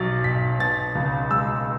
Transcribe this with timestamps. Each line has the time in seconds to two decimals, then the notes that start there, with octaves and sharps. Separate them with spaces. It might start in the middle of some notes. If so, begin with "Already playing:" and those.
Already playing: B1 F#3 A6
0.24 B1 B6
0.59 B2 A6
0.95 C#2
1.31 G#3 E6